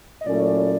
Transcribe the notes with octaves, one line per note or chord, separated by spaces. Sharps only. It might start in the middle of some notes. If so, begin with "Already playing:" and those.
D#5
A#2 F#3 A3 C#4 E4 D5